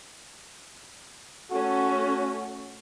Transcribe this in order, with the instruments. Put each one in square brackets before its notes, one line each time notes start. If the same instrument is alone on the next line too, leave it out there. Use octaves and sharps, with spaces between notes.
[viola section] A3 C#4 A4 [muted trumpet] F#4